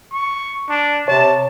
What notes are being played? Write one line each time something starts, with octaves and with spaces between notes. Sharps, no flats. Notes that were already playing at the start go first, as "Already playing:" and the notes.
C#6
D4
C3 C#5 A5